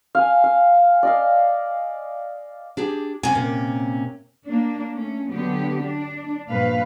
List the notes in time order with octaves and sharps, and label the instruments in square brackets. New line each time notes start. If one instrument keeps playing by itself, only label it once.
[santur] F5 G#5
F5
D5 D#5 F5
[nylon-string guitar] D4 G4 G#4
[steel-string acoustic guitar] C3 C#4 [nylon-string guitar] G#5
[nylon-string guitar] A#2
[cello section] A#3 D4
A3 C#4
D3 F#3 B3 G4
D4
G2 A#2 F3 B4 F5